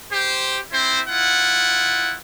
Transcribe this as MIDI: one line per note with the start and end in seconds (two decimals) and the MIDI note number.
0.10 0.58 67
0.10 0.58 72
0.72 1.00 60
0.72 1.00 64
0.72 1.00 72
1.07 2.15 64
1.07 2.15 65
1.07 2.15 78